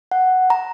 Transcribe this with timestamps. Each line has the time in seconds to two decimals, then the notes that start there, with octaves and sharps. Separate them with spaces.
0.11 F#5
0.50 A#5